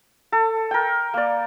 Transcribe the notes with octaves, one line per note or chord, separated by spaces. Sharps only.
A4
A#4 G5
A#3 D5